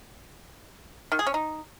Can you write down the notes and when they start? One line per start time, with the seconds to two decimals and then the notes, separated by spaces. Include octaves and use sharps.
1.12 D#3
1.19 G#4
1.27 C#4
1.34 D#4